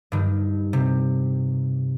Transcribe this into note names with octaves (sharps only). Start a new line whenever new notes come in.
G2 D#3
C3